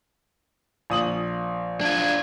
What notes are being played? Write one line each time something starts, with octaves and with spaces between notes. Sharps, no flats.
A#1 D#6 F#7
D4 F4 G#6